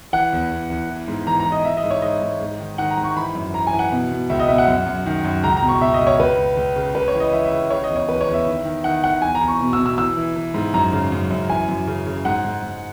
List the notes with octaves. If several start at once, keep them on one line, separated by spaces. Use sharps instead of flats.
E3 F#5
E2
E2
E2
E3
G#2
E3 A#5
A#5
E3
D#5
E3 E5
D#5
G#2
C#5
G#2 D#5
G#2
G#2
D#3
D#3 F#5
A#5
G#2
C#6
E3 B5
F#2
E3 A#5
G#5
E3
F#5
B2
B2
C#2 E5
D#5
B2 E5
F#5
F#2
F#2
D#3
F#2
C#2 A#5
A#5
B2
C#6
B2 E5
D#5
C#2
C#5
C#2 B4
C#2
C#2
C#3
C#2 B4
C#5
E3
D#5
E3 E5
E5
C#2
C#3 C#5
D#5
E2
C#5
E2 B4
C#5
E2
E5
D#3
D#3
D#3 F#5
D#3 F#5
E2 G#5
A#5
E2
C#6
B2
E6
B2
E6
E3 E6
E3
E3
G#2
F#2 A#5
C#3
F#2
F#2
E3 G#5
F#2
C#3
C#3
G#2 F#5
G#2
G#2